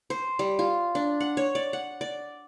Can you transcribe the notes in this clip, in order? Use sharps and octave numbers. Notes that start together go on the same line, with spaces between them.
C5
G3
F4
D4
F#5
C#5
D5
F#5
D5